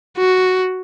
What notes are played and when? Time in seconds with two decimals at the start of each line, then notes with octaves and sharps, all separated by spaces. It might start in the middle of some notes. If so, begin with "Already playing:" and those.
0.17 F#4